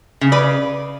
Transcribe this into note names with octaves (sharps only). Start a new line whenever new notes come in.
C#3
B4 D5